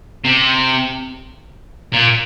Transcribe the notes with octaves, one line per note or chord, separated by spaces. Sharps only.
C3
A#2